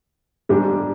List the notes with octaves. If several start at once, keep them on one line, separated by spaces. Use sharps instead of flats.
G#2 G3 D4 G4